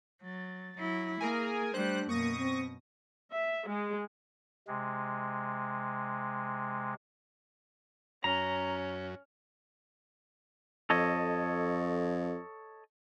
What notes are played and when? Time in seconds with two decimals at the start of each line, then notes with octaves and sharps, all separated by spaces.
0.23 F#3 A6
0.78 F#3 E4
1.20 A#3 G#4 A#4 G#5 F6
1.74 G3 A3 D4 C5 F#6
2.09 F#2 B2 A#3 C#6 D#6 A#6
2.38 C4
3.32 E5
3.67 G#3
4.67 C3 G#3
8.24 F#2 C#4 A#5
10.90 F2 A4 C#5 D#5